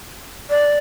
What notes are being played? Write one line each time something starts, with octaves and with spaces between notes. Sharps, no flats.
D5